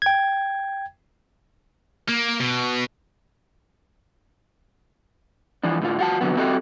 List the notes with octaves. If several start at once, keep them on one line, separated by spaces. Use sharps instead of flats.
G5 G#6
A#3
B2
E3 F3 D4
A2 D3 F4
F4 F#4 A5
F2 D3 F#3 B3
C4 E4 F#4 G4 A4 D#5